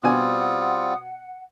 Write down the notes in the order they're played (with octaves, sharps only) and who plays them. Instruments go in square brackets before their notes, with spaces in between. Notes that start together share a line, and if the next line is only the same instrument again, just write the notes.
[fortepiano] B2 D5 G#5 [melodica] G3 C4 F4 [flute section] F#5 [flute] D#6